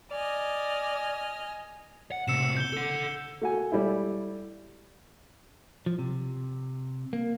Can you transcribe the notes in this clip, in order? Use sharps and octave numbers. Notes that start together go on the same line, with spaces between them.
D5 D#5 G#5 F6
F#5
A2 C3 E6 C#7 E7
G6 G7
A4 F#5
A3 F#4 G#5
G3 A3 E4
F3
C3
A#3